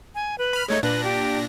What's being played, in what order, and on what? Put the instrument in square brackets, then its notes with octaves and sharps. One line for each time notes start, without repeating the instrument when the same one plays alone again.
[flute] G#5
B4
[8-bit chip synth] B5 F6
[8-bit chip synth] G#3 A3 D#4 [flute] C#5
[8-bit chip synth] A#2 D4 A#6 [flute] B4
[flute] G4